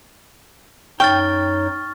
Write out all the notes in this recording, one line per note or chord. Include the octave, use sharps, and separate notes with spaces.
F#2 D#4 C#5 G5 C#6 F6 A6